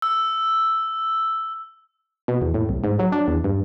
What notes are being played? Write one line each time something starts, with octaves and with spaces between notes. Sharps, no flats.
E6
B2
E2
A2
C2
G#2
F#3
D4
E2
G2